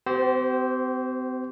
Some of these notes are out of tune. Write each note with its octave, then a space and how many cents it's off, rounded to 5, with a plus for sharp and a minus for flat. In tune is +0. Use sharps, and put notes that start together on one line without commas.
C4 -40 G4 -45 C5 +0